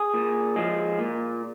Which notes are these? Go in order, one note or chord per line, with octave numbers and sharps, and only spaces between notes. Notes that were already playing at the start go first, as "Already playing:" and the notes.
Already playing: G#4
A#2
F3 G#3
A#2